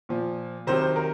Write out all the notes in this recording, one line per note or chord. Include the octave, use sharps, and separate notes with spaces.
A#2 F3
C3 D#3 F#3 C5
C5
A#4